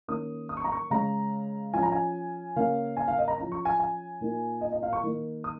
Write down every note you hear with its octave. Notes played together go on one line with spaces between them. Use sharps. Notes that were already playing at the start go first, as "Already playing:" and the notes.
D#3 A#3 C#4 D#6
D#6
C#6
A#5
C#6
C#3 G#3 C#4 A#5
F3 C#4 G#5
A#5
G#5
C#3 A#3 C#4 F5
G#5
F5
D#5
A#5
F3 C#4 A#5
C#6
G#5
G#5
A#2 A#3 D#4
D#5
D#5
F5
C#6
D#3 A#3 D#4
D#6